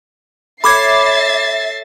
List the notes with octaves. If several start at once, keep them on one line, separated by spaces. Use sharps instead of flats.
A4 C#5 E5 B5 D6 G#6 A6 C7